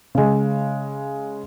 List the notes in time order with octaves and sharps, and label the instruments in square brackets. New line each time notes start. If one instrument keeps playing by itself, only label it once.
[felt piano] C#3 G#3